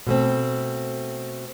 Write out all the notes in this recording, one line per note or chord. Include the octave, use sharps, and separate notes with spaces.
B2 A3 C4